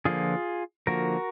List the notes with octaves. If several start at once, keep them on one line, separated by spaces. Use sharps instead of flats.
D3 F3 A#3 F4 G#4
D3 F3 A#3 F#4 A#4